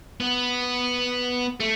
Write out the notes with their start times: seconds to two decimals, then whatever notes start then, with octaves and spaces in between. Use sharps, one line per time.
0.20 B3
1.60 A3